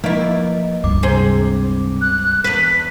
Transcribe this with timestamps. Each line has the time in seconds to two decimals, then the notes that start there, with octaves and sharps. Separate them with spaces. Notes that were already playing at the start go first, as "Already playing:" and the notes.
0.04 F3 A#3 E4 D#5
0.84 C#2 G2 D6
1.03 C3 G#4 C5
2.01 F#6
2.44 E2 B4 B6